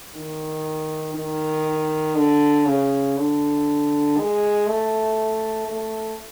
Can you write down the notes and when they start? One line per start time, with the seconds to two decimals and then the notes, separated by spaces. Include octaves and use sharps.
0.15 D#3
1.15 D#3
2.15 D3
2.65 C#3
3.17 D3
4.17 G#3
4.67 A3
5.68 A3